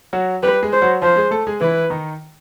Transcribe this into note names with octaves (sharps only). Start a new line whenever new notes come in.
F#3 F#4
G3 G4 B4
G#3 G#4
C5
F#3 F#4
F3 F4 C5
G#3 G#4
A3 A4
G#3 G#4
E3 E4 B4
D#3 D#4